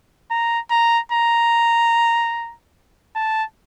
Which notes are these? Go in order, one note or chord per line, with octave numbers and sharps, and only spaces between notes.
A#5
A#5
A#5
A5